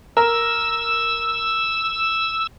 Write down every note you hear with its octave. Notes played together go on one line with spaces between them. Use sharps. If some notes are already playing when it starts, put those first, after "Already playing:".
A#4 E6